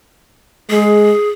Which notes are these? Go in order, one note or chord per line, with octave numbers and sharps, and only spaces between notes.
G#3 G#4